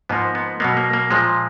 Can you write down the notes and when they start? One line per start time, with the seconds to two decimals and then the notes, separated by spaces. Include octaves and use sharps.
0.09 G#2 F3 A#3 B3
0.35 B3
0.60 B2 F#3 A#3 B3
0.77 A#3
0.93 A#3
1.11 A#2 F3 G#3